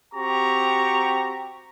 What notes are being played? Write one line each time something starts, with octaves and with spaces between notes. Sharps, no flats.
C4 F#4 G4 A#5 C#6